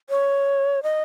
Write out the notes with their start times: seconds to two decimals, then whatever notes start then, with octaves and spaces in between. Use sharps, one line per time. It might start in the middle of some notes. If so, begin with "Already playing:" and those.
0.10 C#5
0.83 D#5